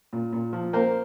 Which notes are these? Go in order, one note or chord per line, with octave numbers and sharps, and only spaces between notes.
A#2
A#2
F3
A#3 C5